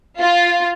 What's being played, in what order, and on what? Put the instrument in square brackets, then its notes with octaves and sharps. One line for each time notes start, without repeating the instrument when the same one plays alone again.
[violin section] F4